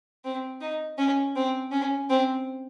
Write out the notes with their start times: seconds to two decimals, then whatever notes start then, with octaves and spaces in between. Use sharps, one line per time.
0.25 C4
0.61 D#4
0.98 C#4
1.36 C4
1.72 C#4
2.10 C4